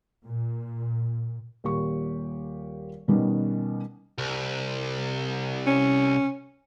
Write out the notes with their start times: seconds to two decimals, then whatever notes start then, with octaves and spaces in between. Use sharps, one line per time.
0.24 A#2
1.64 D#1 A#2 G4 C#6
3.08 B2 D#3 G3 B3 C#4
4.18 C2
5.67 C#4